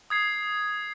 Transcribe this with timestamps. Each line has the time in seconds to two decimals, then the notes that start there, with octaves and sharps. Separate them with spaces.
0.10 D#6 G#6 C7